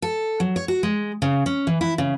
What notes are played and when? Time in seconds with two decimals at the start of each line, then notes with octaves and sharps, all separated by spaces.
0.02 A4
0.40 F#3
0.56 C#5
0.68 F#4
0.83 G#3
1.22 C#3
1.46 C#4
1.67 E3
1.81 E4
1.98 C#3